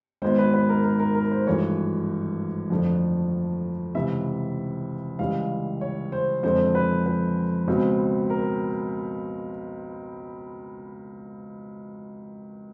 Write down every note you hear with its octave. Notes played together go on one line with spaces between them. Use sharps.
G#1 G#2 D#3 G#3 B3 C5
B4
B4
A#4
A#4
A#4
A#4
C5
G#1 G2 E3 A3 C#5
F2 D3 F3 A3
C#2 C3 E3 E5
C#2 C#3 E3 G3 F5
C#5
C5
F2 D3 F3 G#3 C4 C5
B4
B4
C#2 B2 G#3 C4
A#4